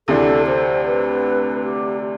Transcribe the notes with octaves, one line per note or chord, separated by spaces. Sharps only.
D2 C3 E3 A3 D4 A4
C5
B4
G4